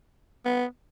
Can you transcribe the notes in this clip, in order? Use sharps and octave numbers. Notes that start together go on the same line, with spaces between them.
B3